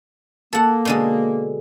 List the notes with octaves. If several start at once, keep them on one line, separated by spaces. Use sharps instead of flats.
A#3 A4 F#5
B2 D3 G#3